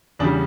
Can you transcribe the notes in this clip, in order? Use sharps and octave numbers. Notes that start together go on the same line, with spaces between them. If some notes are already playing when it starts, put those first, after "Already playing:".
E2 C#3 G3 D4